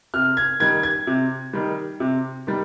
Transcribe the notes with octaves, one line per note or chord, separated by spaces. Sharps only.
C3 F6
G#6
D#3 G3 G#6
G#6
C3
D#3 G3
C3
D#3 G3